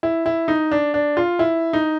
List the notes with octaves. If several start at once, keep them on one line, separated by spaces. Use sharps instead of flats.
E4
E4
D#4
D4
D4
F4
E4
D#4